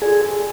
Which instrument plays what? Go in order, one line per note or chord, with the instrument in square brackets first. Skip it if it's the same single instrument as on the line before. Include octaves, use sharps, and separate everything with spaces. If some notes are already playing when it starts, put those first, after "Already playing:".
[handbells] F4 A4 D5 G#5 [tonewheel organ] G#4